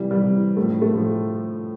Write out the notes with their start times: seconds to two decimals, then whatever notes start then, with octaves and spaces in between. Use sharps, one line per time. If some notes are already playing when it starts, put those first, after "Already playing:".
Already playing: C3 E3 G3
0.11 G3
0.20 C3 E3
0.57 A2 F3 A3
0.82 A3
0.94 A2 F3